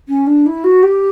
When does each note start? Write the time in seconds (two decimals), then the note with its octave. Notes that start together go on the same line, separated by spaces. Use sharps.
0.08 C#4
0.27 D4
0.46 E4
0.64 F#4
0.83 G4